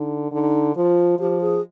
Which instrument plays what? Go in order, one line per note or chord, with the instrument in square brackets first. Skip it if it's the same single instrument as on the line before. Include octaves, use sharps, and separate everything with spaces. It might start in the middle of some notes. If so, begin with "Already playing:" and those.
Already playing: [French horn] D3 [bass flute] D#4
[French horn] D3 [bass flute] D#4
[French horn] F3 [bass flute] F4
[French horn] F3 [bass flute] G4
[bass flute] G#4